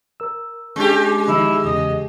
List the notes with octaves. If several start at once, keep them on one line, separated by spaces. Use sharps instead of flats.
A#4 E6
G#3 C#4 D4 G4 G#4
D#3 F3 D#4 E4
E2 C#3 D#5